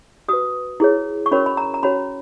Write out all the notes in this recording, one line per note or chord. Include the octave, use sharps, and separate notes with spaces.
F#4 B4 D#6
E4 G#4 C#5
C#6
C#4 F#4 A#4 C#5 B5
B5
A#5
A#5
C#4 F#4 C#5 B5